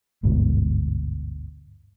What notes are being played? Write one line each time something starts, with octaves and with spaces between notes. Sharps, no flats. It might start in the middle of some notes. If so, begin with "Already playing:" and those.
G1 D2 G#2 B2